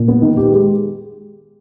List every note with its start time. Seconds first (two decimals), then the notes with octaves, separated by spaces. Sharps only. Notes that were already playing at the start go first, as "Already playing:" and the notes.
Already playing: A#2
0.08 B3
0.22 D#3
0.37 G4
0.52 G#3